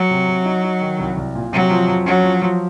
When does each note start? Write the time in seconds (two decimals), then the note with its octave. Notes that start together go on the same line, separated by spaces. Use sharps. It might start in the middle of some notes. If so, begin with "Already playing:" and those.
Already playing: F#3
0.11 C3
0.28 C3
0.46 D#4
0.64 D#4
0.81 D#3
0.99 C2
1.17 C2
1.35 A#2
1.53 C3 F#3
1.71 F3
1.88 F2
2.06 F#3 C#4
2.24 F3
2.42 F3